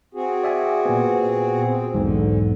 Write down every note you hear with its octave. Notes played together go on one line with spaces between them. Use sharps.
C4 F#4 G#4
D5 E5 G#5
A#2 B3
C4
B1 E2 G#2 D3